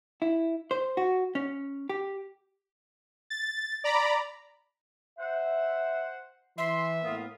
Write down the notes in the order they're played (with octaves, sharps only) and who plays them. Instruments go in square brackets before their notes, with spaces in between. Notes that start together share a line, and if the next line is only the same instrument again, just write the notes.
[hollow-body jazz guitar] E4
C5
F#4
C#4
G4
[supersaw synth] A6
D5 A#5 B5
[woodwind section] C5 F#5 [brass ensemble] E5
[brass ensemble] E3 [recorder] E5 [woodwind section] C6
[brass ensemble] A2 A#3 B3 [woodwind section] F4 D#6